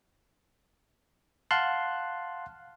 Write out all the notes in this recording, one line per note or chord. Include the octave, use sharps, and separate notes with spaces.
F5 F#5 A5 C6 F#6